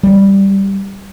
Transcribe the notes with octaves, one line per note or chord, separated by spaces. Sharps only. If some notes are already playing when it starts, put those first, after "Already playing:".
G3